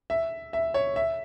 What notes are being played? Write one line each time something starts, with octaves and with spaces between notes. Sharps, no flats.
E5
E5
C#5
E5